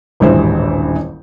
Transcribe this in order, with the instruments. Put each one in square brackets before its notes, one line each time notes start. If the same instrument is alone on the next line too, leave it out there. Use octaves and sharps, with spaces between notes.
[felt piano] D#1 A1 G2 E3 G#3 C5